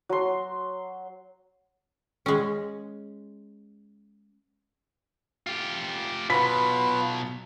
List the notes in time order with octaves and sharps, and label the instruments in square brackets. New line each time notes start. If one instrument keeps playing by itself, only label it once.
[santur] F#3 C6
[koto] G#3 C#4
[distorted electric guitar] F4 G4
[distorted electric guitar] B2 F#3 [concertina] F4 B4 [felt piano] B5 B6